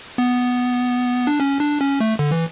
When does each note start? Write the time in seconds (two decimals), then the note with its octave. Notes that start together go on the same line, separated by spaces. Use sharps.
0.18 B3
1.27 D4
1.40 C#4
1.60 D4
1.81 C#4
2.00 A3
2.19 D3
2.31 E3